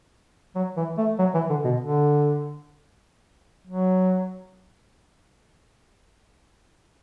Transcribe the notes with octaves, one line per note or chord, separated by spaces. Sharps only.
F#3
E3
A3
F#3
E3
D3
B2
D3
F#3